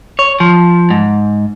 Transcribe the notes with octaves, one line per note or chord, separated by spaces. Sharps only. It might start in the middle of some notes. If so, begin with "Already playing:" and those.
C#5
F3
G#2